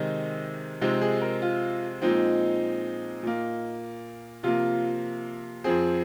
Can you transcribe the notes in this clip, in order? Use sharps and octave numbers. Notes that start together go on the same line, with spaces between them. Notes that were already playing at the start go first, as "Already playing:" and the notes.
Already playing: C3 D#3 G#3 C4 D#5
C3 F3 G#3 C4 D#4
G#4
A#4
F4
A#2 F3 G#3 C4 D#4
A#2 A#3
C3 F3 A#3 F4
F2 F3 C4 G#4